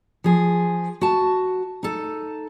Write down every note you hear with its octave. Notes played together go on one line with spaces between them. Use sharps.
F3 G#4
F#4 A5
D#4 A4